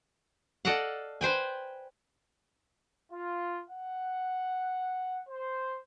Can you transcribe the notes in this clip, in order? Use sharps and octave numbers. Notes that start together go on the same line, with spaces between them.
A4 D5 D#5 F5 F#5
B4 C5 G5 G#5
F4
F#5
C5